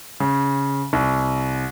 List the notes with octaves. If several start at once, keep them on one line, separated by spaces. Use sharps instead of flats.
C#3
C2